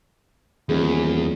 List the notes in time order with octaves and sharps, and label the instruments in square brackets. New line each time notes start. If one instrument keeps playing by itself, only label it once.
[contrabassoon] D#1 [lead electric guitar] E2 [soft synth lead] G#4